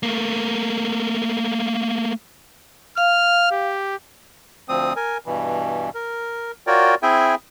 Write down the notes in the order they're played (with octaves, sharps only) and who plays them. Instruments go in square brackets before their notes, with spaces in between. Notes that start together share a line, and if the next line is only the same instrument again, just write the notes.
[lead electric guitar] A3 A#3
[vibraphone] F5 [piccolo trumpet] F6
[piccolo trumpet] G4
[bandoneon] D2 F3 C4 D#6
A#4 G#5
G2 B2 E3
A#4
F4 F#4 A#4 C#5 D5 G5
C4 E4 G#4 E5 G5 G#5